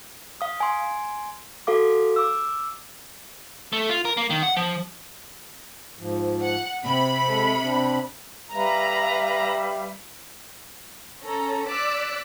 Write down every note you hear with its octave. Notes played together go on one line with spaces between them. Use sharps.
F5 D#6
G#5 C6
F#4 A4 F5 D6
D6 E6
A3
F4
A#4
A#3
D#3
F#5
F3
G#2 F3
F#5
C3 C4 B5
G#3 A4
C4 D4
G3 B4 E5 F5 A#5
C#4 A4 A#5
D5 D6 E6 F#6 B6 D7